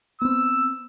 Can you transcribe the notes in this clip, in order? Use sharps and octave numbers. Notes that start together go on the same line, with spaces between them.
B3 C4 E6